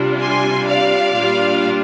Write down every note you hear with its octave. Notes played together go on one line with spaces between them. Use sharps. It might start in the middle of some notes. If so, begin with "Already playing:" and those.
Already playing: C3 G3 D4 F4
G#5 C6
D5 F5
A#2 G3 D4 F4